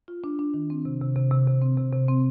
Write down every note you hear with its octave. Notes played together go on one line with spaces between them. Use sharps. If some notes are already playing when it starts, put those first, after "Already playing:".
F4
D4
D4
D#3
C4
C3
C3
C3
C3
C3
C4
C3
C3
C4